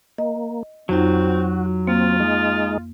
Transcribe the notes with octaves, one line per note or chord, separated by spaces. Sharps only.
A#3 D#5
F2 F#3 C4 D#4 F4 F#4
A#3 C4 F4
G#3 D#4